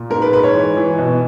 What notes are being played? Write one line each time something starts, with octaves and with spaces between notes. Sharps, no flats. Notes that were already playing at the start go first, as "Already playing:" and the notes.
Already playing: A#2
G#2 A#4
B4
G#2 B4
C#5
E3
E3
B2